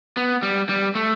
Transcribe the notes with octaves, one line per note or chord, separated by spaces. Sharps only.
B3
G3
G3
A3